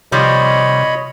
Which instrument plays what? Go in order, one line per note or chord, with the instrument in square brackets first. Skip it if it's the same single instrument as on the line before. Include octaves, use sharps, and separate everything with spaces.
[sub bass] C3 [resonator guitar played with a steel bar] D#3 F3 G3 [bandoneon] C#5 D#5 B5